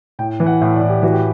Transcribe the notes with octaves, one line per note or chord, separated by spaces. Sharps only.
A2 G5
E3
F#5
A2 E5
D5
A2
G4
E3 F#4
G4